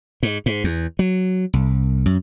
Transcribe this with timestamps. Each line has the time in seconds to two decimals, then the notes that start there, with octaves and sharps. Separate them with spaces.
0.23 G#2
0.46 G#2
0.64 E2
0.99 F#3
1.53 C2
2.06 F#2